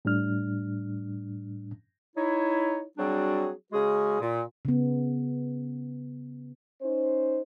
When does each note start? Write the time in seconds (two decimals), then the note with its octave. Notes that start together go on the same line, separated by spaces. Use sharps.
0.05 A2 G3 D4 F6
2.16 D#4 E4 C#5
2.97 F#3 G3 C4 D4 F#4 G#4
3.73 C#3 G#3 C#4 F#4 G#4
4.20 A#2
4.65 C#3 B3
6.82 C#4 D#4 C5